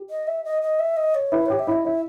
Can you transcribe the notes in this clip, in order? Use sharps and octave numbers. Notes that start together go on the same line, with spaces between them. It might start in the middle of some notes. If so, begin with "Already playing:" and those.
Already playing: G4
D#5
E5
D#5
D#5
E5
D#5
C#5
E4 B4
G4 C#5
E5
E4 D#5
E4 E5